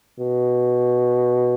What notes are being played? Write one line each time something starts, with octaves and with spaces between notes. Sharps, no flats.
B2